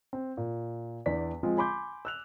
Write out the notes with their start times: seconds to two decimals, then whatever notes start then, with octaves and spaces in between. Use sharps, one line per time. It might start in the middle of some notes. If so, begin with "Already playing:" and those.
0.13 C4
0.37 A#2
1.06 E2 E3 D4 D5 B6
1.43 F3 G#3 C4 F4
1.57 G#5 B5 C6 D6 G6
2.05 E6 F#6 F7